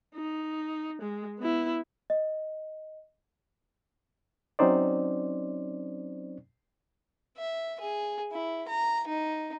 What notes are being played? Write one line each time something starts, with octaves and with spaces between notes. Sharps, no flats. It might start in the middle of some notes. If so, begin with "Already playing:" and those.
D#4
G#3
B3 E4
D#5
F#3 C4 C#4 D#4 C5 D5
E5
G#4
E4
A#5
D#4